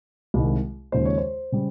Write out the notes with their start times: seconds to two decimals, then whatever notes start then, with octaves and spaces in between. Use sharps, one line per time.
0.34 C2 C3 D#3 G#3
0.92 D#2 C#3 F3 G#3 C5
1.05 C#5
1.18 C5
1.52 C#3 G3